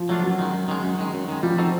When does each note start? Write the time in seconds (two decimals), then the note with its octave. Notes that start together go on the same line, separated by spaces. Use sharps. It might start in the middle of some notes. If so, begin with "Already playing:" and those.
Already playing: F3
0.09 F#3 A3 D4 F4
0.24 F#2 F#3
0.39 D#3 G#3
0.54 F#2
0.68 D#3 G#3
0.84 F#2
0.98 D#3 G#3
1.14 F#2
1.28 D#3 G#3
1.43 F3 G3
1.58 C4 D#4 F#4 A4